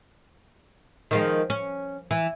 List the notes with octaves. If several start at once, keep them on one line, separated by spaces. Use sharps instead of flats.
D#3 F3 G#3
C#4
E3